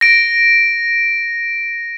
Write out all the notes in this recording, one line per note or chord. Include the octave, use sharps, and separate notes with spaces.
A#6 D7